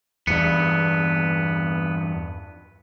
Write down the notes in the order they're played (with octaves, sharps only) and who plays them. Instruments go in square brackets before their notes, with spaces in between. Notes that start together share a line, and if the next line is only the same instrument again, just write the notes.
[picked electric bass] E2 G2 [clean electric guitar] B3